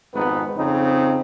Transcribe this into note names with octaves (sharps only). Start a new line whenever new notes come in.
G#1 F2 G#2 B3 D#4 B4
F2 C#3 C4 D#4